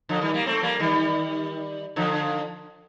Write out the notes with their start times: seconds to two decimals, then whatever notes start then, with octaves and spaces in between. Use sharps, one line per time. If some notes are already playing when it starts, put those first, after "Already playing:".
0.09 D3 F3
0.21 D#3 G3
0.34 G3 A#3
0.46 A3 C4
0.63 G3 A#3
0.80 D#3 G3
1.96 D3 F3